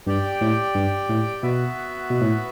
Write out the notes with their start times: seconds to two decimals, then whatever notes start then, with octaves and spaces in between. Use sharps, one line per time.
0.07 G2 G4 D5 G5
0.41 A2
0.75 G2
1.09 A2
1.43 B2 B3 F#4 B4 E5
2.10 B2
2.21 A2